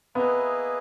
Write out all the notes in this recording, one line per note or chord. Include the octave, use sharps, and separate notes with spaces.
A#3 B3 E4 G#4 B4 D#5